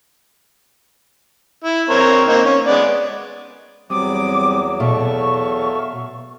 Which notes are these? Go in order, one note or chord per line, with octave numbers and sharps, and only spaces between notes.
E4
C4 A#4 C#5
A#3 C4 D#4
C#4
G#3 B3 D5
E2 F#3 G3 C4 D6 D#6
B2 A4 E5 F5 C#6